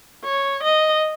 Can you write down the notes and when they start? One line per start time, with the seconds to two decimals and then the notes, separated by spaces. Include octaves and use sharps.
0.24 C#5
0.63 D#5